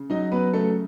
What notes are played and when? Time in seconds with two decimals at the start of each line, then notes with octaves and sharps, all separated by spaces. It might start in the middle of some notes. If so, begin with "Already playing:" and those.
Already playing: C#3
0.10 F#3 D#4 D#5
0.32 F#3 B3 B4
0.53 C#3 A3 A4